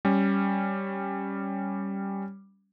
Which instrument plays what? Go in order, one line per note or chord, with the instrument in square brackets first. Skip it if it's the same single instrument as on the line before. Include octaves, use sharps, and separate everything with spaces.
[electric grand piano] G3 C#4